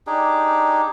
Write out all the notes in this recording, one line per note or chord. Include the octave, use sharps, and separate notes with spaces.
D4 D#4 G4 G#4